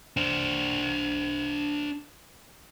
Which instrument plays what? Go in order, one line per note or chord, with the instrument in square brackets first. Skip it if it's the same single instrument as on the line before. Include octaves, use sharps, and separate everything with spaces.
[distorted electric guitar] D4 C5